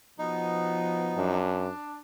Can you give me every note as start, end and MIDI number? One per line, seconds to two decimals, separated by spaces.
0.19 1.15 47
0.19 1.46 53
0.19 1.15 59
0.19 1.38 63
1.17 1.70 42
1.17 2.01 62